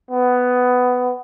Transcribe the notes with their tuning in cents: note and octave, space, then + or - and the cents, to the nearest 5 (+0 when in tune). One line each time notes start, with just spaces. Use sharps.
B3 +10